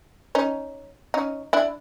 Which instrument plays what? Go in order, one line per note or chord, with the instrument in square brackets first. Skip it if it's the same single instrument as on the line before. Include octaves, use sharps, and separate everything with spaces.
[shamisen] C#4 D#4
C#4 D#4
D4 E4